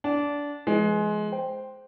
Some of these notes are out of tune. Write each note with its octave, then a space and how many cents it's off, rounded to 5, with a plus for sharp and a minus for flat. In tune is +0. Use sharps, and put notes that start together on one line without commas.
D4 -20 F#5 +25
F3 -25 G#3 +20 B3 +0
C5 +0 G5 +0